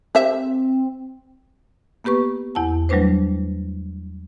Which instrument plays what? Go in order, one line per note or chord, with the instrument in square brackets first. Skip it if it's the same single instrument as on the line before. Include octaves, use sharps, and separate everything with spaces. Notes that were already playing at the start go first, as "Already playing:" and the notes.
[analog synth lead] C4 [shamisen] G4 C5 E5
[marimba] A#3 B3 G4 B4 C#6
E2 E4 F#5 A5
F#3 G3 A3 D4 B4 C5